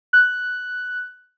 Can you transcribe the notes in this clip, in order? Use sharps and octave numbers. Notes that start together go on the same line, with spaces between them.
F#6